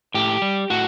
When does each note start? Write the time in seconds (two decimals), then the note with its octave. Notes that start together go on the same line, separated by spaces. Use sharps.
0.14 A2 G4
0.42 G3
0.70 A2 F#4